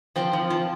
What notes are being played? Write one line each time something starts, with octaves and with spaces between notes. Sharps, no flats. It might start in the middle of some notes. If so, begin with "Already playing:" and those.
F3 C4
F3
F3